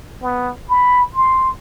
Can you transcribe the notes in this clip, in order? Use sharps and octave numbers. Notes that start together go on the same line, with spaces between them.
B3
B5
C6